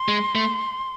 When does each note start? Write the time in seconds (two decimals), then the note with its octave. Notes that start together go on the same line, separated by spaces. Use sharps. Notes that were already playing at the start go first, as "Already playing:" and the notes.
Already playing: C6
0.08 G#3
0.35 A3